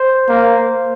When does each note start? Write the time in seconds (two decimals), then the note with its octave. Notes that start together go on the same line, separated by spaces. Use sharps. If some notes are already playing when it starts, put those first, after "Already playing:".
Already playing: C5
0.29 A#3